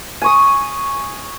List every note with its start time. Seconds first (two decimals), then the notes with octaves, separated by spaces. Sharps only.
0.22 G#5 C#6 D#6